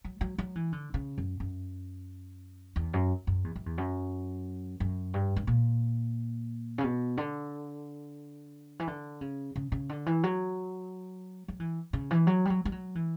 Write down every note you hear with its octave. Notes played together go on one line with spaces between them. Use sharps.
F#3
F#3
F#3
E3
D3
C#3
F#2
F#2
E2
F#2
F#2
E2
F#2
E2
F#2
F#2
G2
G2
A#2
C#3
B2
D3
E3
D3
C#3
C#3
C#3
D3
E3
F#3
F#3
E3
C#3
E3
F#3
G3
F#3
G3
F#3
E3